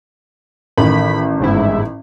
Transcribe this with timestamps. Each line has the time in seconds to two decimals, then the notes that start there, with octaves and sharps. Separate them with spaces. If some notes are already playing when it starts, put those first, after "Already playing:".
0.78 A1 D#3 B5
1.40 G1 G#2 E4